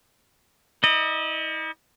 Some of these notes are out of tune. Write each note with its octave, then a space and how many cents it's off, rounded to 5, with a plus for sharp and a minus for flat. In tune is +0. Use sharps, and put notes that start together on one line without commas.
E4 -45 D#5 -30